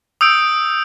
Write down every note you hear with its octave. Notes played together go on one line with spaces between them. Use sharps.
D#6 E6 G6 D7